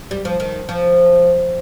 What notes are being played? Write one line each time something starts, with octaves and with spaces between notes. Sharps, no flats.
G3
F3
D#3
F3